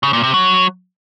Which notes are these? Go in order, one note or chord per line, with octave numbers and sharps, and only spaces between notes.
C#3
A#2
C3
F#3